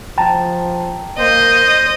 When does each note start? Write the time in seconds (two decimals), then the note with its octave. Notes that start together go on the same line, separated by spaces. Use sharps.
0.18 F3 G5 A5 A#5
1.18 A#3 C5 D#5